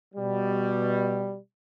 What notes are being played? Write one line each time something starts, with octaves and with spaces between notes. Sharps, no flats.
B2 G3